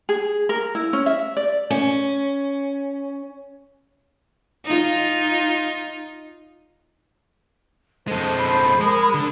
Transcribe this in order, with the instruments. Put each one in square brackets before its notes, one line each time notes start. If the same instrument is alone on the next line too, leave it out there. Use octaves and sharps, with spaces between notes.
[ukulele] G#4
A#4
E4
C#4
E5
D5
[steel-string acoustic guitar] C#4
[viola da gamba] D#4 F4
[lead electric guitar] F2 G#3 [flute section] A4 C5
[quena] B5
[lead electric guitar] G#3 [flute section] A#4 D#6
[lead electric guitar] D3